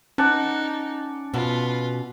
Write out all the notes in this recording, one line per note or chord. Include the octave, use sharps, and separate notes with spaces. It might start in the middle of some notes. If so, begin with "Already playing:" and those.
C#4 D#4 D5 F#5 A5
B2 F4 B4